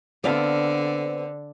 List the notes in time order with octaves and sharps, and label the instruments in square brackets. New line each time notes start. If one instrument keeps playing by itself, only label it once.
[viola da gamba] D3 [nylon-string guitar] B3 C4 F5 [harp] D5 A5